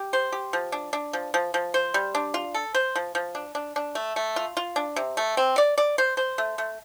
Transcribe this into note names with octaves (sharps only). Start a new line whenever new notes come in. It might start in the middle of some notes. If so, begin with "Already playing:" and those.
Already playing: G4
C5
G4
F3
D4
D4
F3
F3
F3
C5
G3
D4
F4
A4
C5
F3
F3
D4
D4
D4
A3
A3
F4
F4
D4
C3
A3
C4
D5
D5
C5
C5
A3
A3